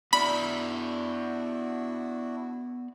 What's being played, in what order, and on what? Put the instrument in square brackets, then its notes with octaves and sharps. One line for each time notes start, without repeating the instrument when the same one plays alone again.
[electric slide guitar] B3 D5 [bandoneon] D4 E4 F#4 [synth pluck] B5